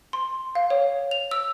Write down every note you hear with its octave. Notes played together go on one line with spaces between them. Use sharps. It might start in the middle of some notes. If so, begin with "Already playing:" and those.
C6
F5
C#5
F7
E6